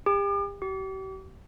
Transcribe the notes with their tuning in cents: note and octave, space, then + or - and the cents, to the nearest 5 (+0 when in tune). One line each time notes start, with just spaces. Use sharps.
G4 +40
G4 -40